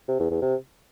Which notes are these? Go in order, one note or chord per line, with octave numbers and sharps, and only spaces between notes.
C3
E2
E2
C3